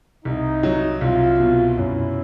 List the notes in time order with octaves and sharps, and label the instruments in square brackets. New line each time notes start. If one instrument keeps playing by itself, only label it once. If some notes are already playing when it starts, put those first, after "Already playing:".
[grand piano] C2 [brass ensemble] D#4
[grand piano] F#3
[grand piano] C2 [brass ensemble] F4
[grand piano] B2
[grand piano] F#2 [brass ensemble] E4